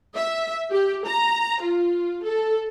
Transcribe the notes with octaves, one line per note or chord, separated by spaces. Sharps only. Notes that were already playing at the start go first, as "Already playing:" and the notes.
E5
G4
A#5
F4
A4